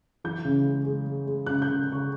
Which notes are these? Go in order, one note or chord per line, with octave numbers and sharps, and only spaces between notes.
E3 G6
C#3
G#3
G#3
G#3
G#3
C#3 F#6
C#3 G6
C#3
C#6